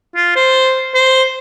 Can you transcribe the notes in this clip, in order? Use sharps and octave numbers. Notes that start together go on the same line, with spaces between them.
F4
C5
C5